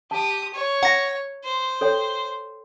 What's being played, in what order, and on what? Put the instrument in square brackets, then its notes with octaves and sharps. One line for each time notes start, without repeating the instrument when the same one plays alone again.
[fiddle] G4 D#6 [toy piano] A5
[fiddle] C#5
[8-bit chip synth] F#5 A#6 [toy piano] A#5
[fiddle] C5
[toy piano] A4 C#5 G5